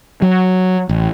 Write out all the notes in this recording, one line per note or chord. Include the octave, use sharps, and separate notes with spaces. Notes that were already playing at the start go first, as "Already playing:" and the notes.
F#3
A1